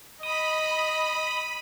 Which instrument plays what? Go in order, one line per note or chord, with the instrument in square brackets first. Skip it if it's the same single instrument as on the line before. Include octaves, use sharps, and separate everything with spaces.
[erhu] D#5 [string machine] B5 [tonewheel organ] D#6